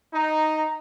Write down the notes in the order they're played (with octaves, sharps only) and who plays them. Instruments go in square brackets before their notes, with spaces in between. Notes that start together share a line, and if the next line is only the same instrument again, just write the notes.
[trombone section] D#4 [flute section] A#5